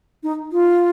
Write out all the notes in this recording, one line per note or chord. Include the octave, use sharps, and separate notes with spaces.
D#4
F4